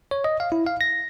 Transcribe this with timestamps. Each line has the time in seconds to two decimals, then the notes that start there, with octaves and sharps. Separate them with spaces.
0.11 C#5
0.24 D#5
0.40 F5
0.52 E4
0.67 F5
0.81 A#6